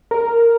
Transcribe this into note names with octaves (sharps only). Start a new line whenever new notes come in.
A#4